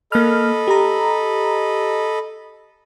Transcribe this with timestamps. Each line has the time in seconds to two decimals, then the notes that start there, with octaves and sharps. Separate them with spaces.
0.12 A#3 A4 D#5 B5 F6
0.68 G4 A#5